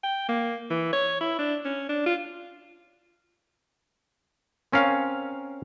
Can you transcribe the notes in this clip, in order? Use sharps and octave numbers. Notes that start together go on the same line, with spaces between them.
G5
A#3
E3
C#5
E4
D4
C#4
D4
F4
C4 C#4 A#4 F5